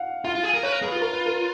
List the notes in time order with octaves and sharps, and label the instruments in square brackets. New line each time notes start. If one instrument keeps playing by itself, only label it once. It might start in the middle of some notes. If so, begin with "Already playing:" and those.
Already playing: [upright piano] F5 F#5
[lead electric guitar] F4 [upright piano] F5
[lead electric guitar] F4
G#4
A#4
[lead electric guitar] B4 [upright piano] C#5
[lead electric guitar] A#4
[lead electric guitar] G#4 [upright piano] B4
[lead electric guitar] F4
[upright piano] A#4
B4
A#4